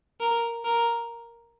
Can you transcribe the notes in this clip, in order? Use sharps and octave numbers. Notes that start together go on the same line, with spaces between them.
A#4
A#4